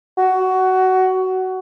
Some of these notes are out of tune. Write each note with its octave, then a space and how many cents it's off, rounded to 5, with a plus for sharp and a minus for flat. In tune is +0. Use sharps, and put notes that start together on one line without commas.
F#4 +15